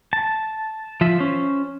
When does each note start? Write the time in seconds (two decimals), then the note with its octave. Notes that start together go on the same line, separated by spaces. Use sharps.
0.13 A5
1.01 F3 F4 E5
1.19 C#4 C5